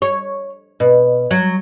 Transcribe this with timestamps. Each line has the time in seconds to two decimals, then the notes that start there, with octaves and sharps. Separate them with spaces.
0.02 C#5
0.80 B2
1.31 F#3